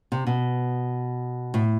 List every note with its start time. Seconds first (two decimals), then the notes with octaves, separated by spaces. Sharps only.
0.12 C3
0.27 B2
1.54 A2